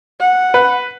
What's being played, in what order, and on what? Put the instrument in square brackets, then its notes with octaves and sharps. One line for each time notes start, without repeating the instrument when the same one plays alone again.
[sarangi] F#5
[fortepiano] B4